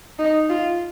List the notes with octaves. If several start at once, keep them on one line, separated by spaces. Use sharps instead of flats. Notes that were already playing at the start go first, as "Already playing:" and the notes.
D#4
F4